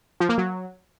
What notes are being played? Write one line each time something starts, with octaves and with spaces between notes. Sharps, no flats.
F3
A#3
F#3